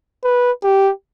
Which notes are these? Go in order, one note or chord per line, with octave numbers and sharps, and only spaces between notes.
B4
G4